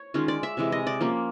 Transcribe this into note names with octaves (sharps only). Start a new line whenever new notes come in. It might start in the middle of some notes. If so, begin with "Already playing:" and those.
Already playing: C#5
D#3 G#3 C#4 F4
D5
E5
C3 E3 G#3
D#5
D5
F3 A#3 C#4